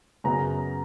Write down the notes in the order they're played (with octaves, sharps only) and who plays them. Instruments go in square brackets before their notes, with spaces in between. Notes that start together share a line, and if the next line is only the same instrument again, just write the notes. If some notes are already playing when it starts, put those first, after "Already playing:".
[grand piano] F#2 C#3 F#3 B3 A#5